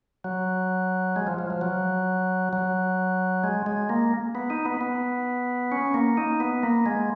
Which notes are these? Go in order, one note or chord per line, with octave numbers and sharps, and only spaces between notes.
F#3
G#3
F3
F3
F3
F#3
F#3
G#3
G#3
A#3
B3
D#4
B3
B3
C#4
A#3
D#4
B3
A#3
G#3